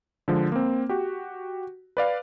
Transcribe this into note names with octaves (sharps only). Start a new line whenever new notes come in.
D3 F3 G#3
A#3 C4
F#4 G4
B4 D5 F5